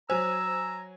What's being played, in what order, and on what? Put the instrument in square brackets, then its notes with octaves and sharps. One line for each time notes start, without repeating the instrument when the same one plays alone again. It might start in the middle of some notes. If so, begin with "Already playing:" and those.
[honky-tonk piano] F#3 G#5 [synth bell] C5 [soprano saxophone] A#5 [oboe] E6